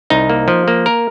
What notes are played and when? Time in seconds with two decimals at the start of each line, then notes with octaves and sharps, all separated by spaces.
0.10 C2 D#4
0.30 A#3
0.48 F3
0.68 A#3
0.86 A#4